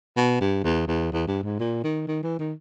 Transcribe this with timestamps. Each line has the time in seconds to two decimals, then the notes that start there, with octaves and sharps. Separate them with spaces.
0.16 B2
0.41 G2
0.64 E2
0.87 E2
1.12 E2
1.27 G2
1.43 G#2
1.59 A#2
1.84 D#3
2.07 D#3
2.23 E3
2.39 D#3